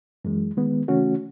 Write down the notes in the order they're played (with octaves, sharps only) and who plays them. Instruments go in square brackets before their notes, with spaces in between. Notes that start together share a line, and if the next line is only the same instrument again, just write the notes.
[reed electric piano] F#2 E3 G#3
D#3 G#3 B3
C#3 E3 A3 C#4 F#4